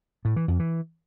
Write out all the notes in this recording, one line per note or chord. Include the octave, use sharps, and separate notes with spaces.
A2
E3
F2
E3